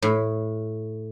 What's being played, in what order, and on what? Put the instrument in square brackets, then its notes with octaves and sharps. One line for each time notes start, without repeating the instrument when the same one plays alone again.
[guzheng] A2